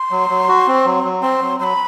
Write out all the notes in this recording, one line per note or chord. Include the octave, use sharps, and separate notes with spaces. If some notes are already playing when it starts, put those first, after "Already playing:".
Already playing: C6
F#3
F#3
F#4
C4
F#3
F#3
C4 C6
F#3
F#3 B5 C6